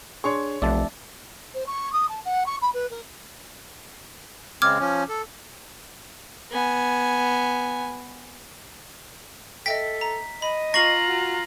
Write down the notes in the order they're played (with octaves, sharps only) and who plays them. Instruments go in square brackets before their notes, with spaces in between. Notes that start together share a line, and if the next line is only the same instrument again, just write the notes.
[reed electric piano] D4 G#4 [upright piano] C#5 C6 C#6
[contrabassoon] F1 [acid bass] B1 [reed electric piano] D5 E5 A5
[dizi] C5
C#6
D#6
A5
F#5
C#6
B5
B4
A#4
[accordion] C#3 G#3 C4 [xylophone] D6 F6 G#6
[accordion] F3 C#4
A4
[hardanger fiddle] B3 G#5
[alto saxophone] A4 [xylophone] D#5 E5 G5 [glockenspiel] B6
[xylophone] A#5
[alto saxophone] D#5 [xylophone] B5
[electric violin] F4 A#5 [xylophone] C#6 C7 [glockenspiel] A#6 F#7
[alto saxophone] F#4